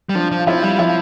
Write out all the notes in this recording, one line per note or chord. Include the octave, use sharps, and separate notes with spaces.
G3
F3 D4
F3
F4
F3 E4
G3 F4
F3 E4